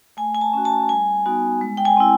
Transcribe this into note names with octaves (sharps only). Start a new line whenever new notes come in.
A3 G#5
G#5
A5
C#4 F#4
A5
G3 G#5
B3 D#4 F#4
G#3
G5
G#5
C4 E4